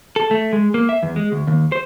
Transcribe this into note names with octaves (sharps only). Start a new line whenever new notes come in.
A4
A3
G#3
A#3
E5
E2
G#3
D2
D#2
C5